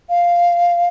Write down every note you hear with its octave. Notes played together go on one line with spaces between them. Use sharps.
F5